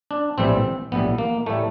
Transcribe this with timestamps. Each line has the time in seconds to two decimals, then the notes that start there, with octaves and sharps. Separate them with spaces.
0.11 D4
0.38 A#1 A2 E3 G3 C4
0.92 A#1 A2 E3 G3 B3
1.18 A#3
1.46 A2 E3 G3 A3